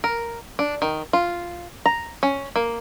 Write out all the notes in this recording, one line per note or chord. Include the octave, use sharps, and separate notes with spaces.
A#4
D4
D#3
F4
A#5
C#4
A#3